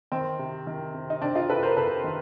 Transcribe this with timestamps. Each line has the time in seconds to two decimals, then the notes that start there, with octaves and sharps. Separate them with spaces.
0.12 D#3 C4
0.39 C3
0.67 D#3
0.94 C3
1.10 D#4
1.21 C3 C4 D4
1.35 D#4 F4
1.49 C3 A4 B4
1.63 A#4 C5
1.76 C3 A4 B4
2.04 D#3